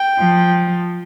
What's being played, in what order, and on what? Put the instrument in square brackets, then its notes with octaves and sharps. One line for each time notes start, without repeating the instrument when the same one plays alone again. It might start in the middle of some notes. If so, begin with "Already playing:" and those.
Already playing: [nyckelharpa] G5
[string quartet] F3